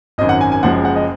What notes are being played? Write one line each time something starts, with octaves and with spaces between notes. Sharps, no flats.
G#1 F#2 D#3 D#5
F#5
G#5
G#5
F#1 F#2 F3 G#3 F#5
F#5
D#5